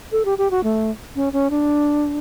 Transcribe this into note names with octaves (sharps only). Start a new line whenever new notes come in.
A4
G4
G4
F#4
A3
C#4
C#4
D4